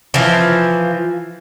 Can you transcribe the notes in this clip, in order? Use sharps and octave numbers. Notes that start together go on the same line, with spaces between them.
E3 F3